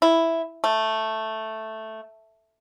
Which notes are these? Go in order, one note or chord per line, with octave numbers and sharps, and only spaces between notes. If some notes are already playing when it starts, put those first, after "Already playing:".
E4
A3